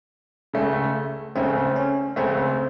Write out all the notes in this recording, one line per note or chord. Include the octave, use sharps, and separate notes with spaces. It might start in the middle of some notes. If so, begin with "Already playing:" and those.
C#2 C#3 A3
C#2 C#3 A3 C4
C#4
C#2 C#3 A3 C4